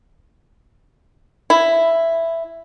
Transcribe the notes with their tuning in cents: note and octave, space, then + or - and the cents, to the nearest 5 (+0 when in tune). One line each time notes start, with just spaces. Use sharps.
E4 +5